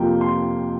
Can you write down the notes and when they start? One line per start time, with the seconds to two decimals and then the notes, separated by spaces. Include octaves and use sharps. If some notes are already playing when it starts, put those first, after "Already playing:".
Already playing: F2 C3 F3 A#3 G5
0.21 C6